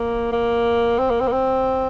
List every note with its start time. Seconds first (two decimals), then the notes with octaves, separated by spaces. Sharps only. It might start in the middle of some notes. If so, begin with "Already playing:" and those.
Already playing: A#3
0.32 A#3
0.99 C4
1.10 A#3
1.20 C4
1.27 A#3
1.32 C4